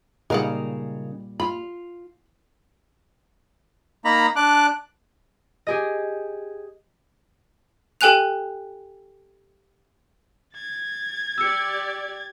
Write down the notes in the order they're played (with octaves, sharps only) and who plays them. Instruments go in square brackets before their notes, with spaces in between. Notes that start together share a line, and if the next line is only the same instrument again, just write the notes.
[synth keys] A#2 G3 [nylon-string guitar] C#3 D#4 A#4 [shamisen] G#3 F5 F#5
[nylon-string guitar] F4 [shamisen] B5
[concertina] A#3 D#4 A#5 B5
D4 D6 F#6
[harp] G4 G#4 D#5
[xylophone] G4 A4 G5 G#5 F#6 F7
[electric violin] G#6 A6
[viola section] G4 D5 [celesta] E6 C#7